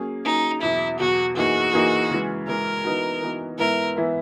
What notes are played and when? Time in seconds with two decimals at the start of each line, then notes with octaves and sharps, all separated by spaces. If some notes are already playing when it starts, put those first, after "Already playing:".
Already playing: F#3 A#3 C#4 G#4
0.25 F#3 A#3 C#4 D#4 G#4
0.62 E2 B2 F#3 E4
1.00 E2 B2 F#3 F#4
1.36 F#2 E3 A#3 D#4 F#4 G#4
1.73 F#2 E3 A#3 D#4 G#4
2.10 C#3 E3 G#3
2.48 C#3 E3 G#3 A#4
2.84 E3 B3 D#4 F#4
3.22 E3 B3 D#4 F#4
3.58 G#2 E3 B3 E4 A#4
3.97 E3 B3 E4